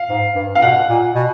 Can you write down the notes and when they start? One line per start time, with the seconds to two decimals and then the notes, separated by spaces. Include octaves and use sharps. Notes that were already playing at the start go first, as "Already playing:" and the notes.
Already playing: F5
0.09 G#2
0.35 G2
0.55 F5
0.62 B2 F#5
0.89 A#2
1.15 B2